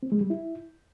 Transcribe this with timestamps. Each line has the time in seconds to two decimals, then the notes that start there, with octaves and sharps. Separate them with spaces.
0.03 C4
0.12 G#3
0.21 G3
0.30 E4